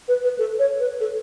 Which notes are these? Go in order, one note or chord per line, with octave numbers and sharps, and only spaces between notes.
B4
B4
A4
C#5
B4
A4